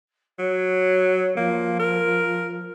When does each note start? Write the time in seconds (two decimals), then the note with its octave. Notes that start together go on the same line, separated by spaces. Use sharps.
0.39 F#3 C#5
1.37 F3 A#3
1.79 A#4